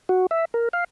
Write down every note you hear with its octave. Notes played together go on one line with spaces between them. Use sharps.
F#4
E5
A#4
F5